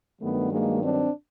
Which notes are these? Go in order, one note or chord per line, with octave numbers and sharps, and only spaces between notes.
G2 D#3 F#3 A3 B3
G#3 A#3
C4 D4